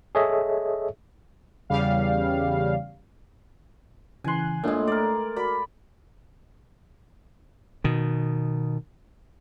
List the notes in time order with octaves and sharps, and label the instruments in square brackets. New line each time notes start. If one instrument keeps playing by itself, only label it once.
[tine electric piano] G#4 A4 C#5 D#5 E5
[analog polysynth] E2 C#3 G3 F5
[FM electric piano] C#3 E3 F#6 [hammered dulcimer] G#5 C6
[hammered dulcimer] A2 G#3 [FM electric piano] A#3 D4 F4
[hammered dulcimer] A#4 D5
[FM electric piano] F#4 A#4 D5 [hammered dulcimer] B5
[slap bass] B2 D#3